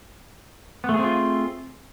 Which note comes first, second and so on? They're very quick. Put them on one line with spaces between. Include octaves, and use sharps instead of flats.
B3 A3 G#4 C4 F4